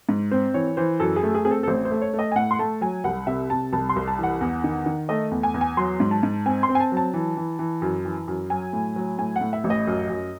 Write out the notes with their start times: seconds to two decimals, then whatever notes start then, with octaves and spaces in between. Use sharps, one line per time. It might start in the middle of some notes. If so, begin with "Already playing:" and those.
0.09 G#2
0.31 C4 C5
0.54 E3 C#5
0.77 E3 C5
1.00 F#2 A4
1.16 G#4
1.23 A3
1.35 G#4
1.45 C4 G#4
1.51 A4
1.63 A4
1.67 A1 C5
1.85 C5
1.91 A3
2.02 C#5
2.13 A3
2.19 D#5
2.32 G#5
2.36 A2 F#5
2.51 C6
2.59 A3 A5
2.81 F#3 G#5
3.04 C2 F#5
3.27 C3 E5
3.50 C3 A5
3.73 C2 A5
3.89 C6
3.96 C2
4.08 A5
4.19 E3 F#5
4.41 E2
4.64 D#3
4.86 D#3
5.09 A3 D#5
5.31 E2
5.43 G#5
5.54 E2
5.61 G#5
5.77 F#3 C6
6.00 G#2
6.11 A5
6.23 G#2
6.46 C4 G#5
6.63 C6
6.69 C4
6.75 G#5
6.80 A5
6.92 F#3 A5
7.14 E3
7.37 E3
7.59 E3
7.82 F#2
8.05 E3
8.28 F#2
8.50 F#3 G#5
8.73 A2
8.96 F#3
9.18 A2 G#5
9.36 F#5
9.41 A2
9.53 E5
9.64 A1
9.70 D#5
9.87 F#2
10.09 F#2